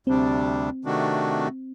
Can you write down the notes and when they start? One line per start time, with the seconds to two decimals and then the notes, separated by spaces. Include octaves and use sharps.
0.07 D2 C3 G3 C4 D4
0.85 C3 D#3 A3 D4 F#4